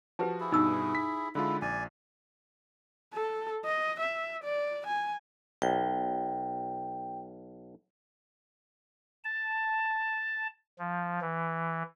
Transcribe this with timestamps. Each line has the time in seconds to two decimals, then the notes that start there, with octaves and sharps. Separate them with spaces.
0.19 F3 F#4 G4 B4 A5
0.40 E4 G#4
0.52 G2 B2 D#4 E6
0.95 B6
1.35 D3 G#3 E4 F4
1.62 A#1 D5 G#5
3.14 A4
3.65 D#5
4.00 E5
4.44 D5
4.87 G#5
5.62 B1 G5
9.24 A5
10.79 F3
11.21 E3